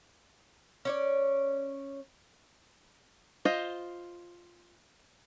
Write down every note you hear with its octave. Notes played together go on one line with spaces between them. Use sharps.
C#4 C#5 D5
F4 C5 D#5